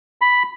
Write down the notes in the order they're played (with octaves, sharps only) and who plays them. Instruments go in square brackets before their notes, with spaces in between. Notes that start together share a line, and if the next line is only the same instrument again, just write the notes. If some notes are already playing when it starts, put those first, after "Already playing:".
[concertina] B5